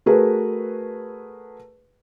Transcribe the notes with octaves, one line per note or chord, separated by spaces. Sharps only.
A3 F#4 G#4 A#4 B4